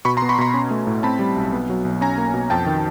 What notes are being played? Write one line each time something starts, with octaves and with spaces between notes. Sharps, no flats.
B2 B5 C#6
A#5 C6
B3
B5 C#6
B2 A#5 C6
C#4
A3
A2
C4 A5 B5
G3
B1
B3
F#3
B1
C#4 G#5 A#5
A#3
B2
F2 G5 A5
D#3